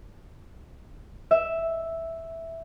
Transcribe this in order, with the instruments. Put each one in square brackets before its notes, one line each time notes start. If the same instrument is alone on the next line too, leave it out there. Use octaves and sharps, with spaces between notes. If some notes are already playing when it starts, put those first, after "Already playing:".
[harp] E5